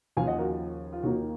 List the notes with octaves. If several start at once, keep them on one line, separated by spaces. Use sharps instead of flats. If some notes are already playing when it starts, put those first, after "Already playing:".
D#2 C#3 F3 F5 G#5
D#5 F#5
F#4 A#4
F4
F4
D#2 D#3 A#3 D#4 F#4